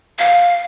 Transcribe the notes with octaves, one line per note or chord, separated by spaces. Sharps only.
F5